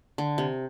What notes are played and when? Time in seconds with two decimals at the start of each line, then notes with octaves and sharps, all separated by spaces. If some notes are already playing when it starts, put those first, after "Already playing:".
0.18 D3
0.38 C3